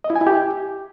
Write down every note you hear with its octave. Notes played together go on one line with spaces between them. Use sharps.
D#5
E4
G#5
E4
G4